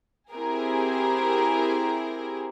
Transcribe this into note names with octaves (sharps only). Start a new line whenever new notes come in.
C4 E4 G4 G#4 A#4